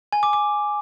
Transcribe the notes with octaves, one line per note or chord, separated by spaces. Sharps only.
G#5
D6
D6